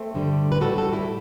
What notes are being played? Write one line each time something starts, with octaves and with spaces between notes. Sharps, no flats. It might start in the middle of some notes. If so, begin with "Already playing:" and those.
Already playing: A3 C4
G2 D3 G3
B4
A2 G3 F#4 A4
F#4 A4
E4 G4